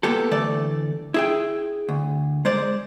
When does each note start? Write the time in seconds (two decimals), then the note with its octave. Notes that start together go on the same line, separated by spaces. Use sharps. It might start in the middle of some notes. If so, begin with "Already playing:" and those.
0.03 A#3 B3 G4 A4
0.31 D2 E3 A3 D5
1.14 E4 G#4 G5
1.89 D2
2.45 G#3 C5 D5